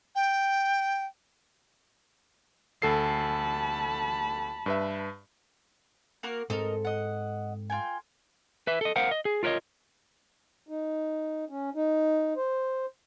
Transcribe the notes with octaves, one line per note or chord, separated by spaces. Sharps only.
G5
D2 A4 A5 B5 C7
G2 B4 E5
A#3 F#4 A#4
G#2 C4 A4 A#4 D#5
D#5 F#5
F4 G5 G#5
B4 E5
A4 D#5
A#4 C5 F5 F#5
D#5
G#4
F4 A#4 B4 C#5 D#5
D#4
C#4
D#4
C5